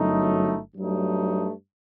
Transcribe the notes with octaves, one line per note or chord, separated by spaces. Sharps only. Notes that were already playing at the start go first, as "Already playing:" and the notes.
Already playing: G1 F#2 F#3 A3 D#4
G2 F#3 A3 D#4